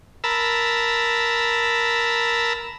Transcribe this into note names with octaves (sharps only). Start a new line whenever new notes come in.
A#4 A5 B5 E6